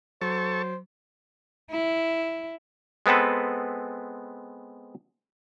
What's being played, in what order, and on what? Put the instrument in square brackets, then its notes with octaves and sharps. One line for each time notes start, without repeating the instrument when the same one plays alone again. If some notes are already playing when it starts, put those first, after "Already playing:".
[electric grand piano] F#3 [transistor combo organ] A4 A5 C#6 [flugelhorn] C5
[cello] E4
[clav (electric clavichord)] G#3 B3 C4 A4 B4